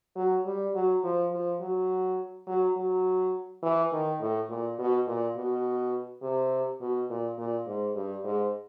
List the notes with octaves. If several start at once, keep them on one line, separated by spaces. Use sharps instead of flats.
F#3
G3
F#3
F3
F3
F#3
F#3
F#3
E3
D#3
A2
A#2
B2
A#2
B2
C3
B2
A#2
A#2
G#2
G2
G#2